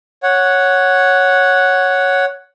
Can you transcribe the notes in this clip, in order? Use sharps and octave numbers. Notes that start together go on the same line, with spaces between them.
C#5 F#5